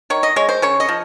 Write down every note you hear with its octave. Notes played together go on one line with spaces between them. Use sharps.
D#3 C#5
D#5
G#3 C#5
C5
C#3 C#5
D#5
F3